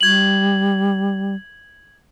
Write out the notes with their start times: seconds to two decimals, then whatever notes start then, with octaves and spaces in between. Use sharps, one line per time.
0.01 G3 G#6 F#7